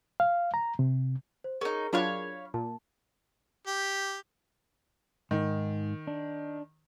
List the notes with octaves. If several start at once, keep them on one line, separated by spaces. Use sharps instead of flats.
F5
A#5
C3
C5
C#4 D#4 G#4 A#4
F#3 D4 F4 C#5 F5 B5
A#2 A5
G4
G#2 D#3
D4